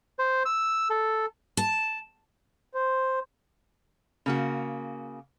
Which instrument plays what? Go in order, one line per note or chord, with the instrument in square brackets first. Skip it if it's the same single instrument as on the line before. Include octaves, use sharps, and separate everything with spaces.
[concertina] C5
E6
A4
[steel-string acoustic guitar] A5
[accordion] C5
[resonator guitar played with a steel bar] C#3 A#3 F#4